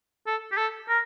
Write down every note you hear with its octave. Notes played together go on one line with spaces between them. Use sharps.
A4
G4
A4
A#4